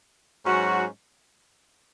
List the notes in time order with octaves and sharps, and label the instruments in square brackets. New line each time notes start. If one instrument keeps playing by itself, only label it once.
[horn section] G#2 F#3 C#4 F#4